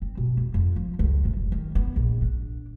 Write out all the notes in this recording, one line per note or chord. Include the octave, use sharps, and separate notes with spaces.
C4
B2
E2
F2
F3
C#2
C3
F1
D#3
B3
A#1
D4